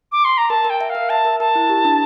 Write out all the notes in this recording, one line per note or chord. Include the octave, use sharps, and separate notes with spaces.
D6
C6
A#5
A#4 A5
A#4
G5
E5
F5
A#4
E5 A5
A#4
A#4 A5
E4
G4
D4